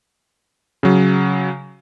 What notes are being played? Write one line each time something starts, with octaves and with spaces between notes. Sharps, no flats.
C#3 F#3